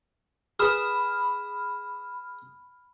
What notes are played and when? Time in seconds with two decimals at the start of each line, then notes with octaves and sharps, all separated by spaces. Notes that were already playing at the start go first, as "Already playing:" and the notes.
0.59 G#4 B4 B5 F6